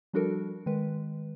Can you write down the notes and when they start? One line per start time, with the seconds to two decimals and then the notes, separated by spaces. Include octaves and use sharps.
0.14 F3 G3 D4 F#4 A4 A#4
0.66 D#3 G#3 B4